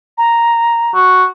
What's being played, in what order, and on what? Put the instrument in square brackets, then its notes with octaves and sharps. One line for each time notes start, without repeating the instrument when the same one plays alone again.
[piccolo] A#5
[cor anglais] F#4